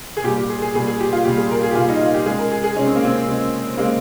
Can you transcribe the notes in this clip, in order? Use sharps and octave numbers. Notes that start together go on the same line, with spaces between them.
G#4
A#2 G3 G4
G4
G#4
G#4
A#2 G3 G#4
G#4
G4
F4
A#2 G3 G4
G#4
A#4
G#4
G4
A#2 G3 F4
D#4
F4
G4
C#3 G#3 G#4
A#4
G#4
G#4
C#3 G#3 C#4
C4
A#3
C4
C#3 G#3
C#3 G#3 A#3